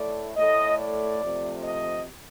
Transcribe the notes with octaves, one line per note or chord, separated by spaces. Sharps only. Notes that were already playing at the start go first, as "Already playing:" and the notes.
Already playing: A2 A3 D5
A2 A3 D#5
D5
C3 F3 A3
D#5